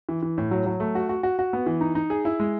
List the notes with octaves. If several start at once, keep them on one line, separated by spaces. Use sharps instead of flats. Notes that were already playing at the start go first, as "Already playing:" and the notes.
E3
E3
A2
F#3
F#3
A3
F#4
F#4
F#4
F#4
B3
E3
D#4
D#4
G#4
E4
G#3